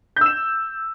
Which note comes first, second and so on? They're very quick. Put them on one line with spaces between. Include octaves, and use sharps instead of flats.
G6 E6 E7